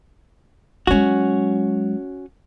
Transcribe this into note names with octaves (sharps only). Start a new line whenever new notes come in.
F#3 G#3 C#4 F#4